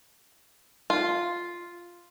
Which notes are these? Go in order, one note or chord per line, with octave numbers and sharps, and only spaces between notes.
F4